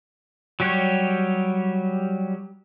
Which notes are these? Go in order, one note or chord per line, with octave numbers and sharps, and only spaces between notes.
F#3 G3 G4 C#5